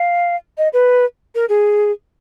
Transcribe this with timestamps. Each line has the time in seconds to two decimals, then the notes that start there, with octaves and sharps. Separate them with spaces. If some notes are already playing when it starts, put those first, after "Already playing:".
Already playing: F5
0.58 D#5
0.73 B4
1.35 A#4
1.49 G#4